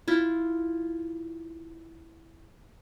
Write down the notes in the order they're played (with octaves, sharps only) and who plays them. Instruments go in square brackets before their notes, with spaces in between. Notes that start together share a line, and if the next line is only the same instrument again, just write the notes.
[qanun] E4 F4